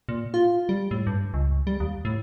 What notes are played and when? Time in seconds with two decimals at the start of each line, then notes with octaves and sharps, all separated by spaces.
0.09 A#2
0.34 F4
0.69 G3
0.91 A2
1.07 G2
1.34 C#2
1.67 G3
1.80 D#2
2.05 A2